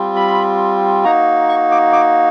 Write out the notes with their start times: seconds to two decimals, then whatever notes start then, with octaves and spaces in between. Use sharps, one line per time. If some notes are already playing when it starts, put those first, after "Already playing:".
Already playing: G3 C4 F4
0.16 B5
1.04 A#3 D#4 F#4 A#5
1.49 C#6
1.71 D6
1.93 D6